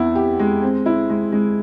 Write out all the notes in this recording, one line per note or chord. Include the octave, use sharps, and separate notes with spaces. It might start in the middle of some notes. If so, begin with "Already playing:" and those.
Already playing: E2 B3 E4
G4
G#3
C4
E4
G#3
G#3